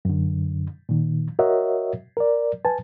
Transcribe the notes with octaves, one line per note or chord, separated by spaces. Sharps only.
F#2 D3
A#2 D#3
F#4 A#4 C#5 D#5 E5 F#5
A#4 D5
B4 G#5 A5